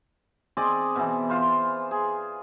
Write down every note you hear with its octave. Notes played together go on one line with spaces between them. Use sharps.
C4 G#4 D5 D#5
B2 E3
F4 C5
G#4